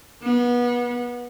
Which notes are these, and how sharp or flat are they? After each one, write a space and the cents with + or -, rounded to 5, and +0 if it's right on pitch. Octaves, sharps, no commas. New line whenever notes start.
B3 -25